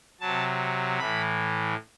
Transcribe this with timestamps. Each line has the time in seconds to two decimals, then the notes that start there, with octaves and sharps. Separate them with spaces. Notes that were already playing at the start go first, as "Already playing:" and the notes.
0.20 C3 F#3 A5
0.98 A2 E3 B5